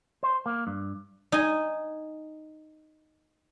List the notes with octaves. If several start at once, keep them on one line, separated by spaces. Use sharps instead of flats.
C5
A#3
G2
D#4 G#5